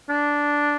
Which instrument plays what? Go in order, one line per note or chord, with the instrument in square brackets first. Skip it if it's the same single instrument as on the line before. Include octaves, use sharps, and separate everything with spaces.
[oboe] D4